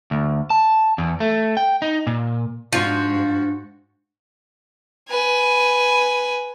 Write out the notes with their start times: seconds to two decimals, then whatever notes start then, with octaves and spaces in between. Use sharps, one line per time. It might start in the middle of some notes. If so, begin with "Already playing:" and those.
0.11 D2
0.50 A5
0.98 E2
1.20 A3
1.57 G5
1.82 D#4
2.07 A#2
2.73 G#2 F3 D4 F4 F#4
5.09 B4 G#5